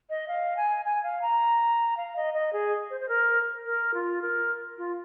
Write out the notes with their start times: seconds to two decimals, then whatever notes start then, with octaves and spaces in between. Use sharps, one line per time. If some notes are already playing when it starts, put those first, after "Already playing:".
0.10 D#5
0.28 F5
0.57 G#5
0.85 G#5
1.03 F5
1.22 A#5
1.97 F5
2.16 D#5
2.34 D#5
2.53 G#4
2.90 C5
3.00 C5
3.09 A#4
3.66 A#4
3.94 F4
4.22 A#4
4.78 F4